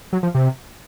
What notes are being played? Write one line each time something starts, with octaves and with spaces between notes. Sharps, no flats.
F#3
F3
C3